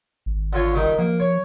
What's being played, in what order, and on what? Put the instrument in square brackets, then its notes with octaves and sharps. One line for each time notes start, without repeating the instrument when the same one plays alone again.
[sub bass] G#1
[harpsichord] D3 F4 C#5
G2 D#3 D#4
[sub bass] F3 [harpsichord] A#3
[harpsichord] C#5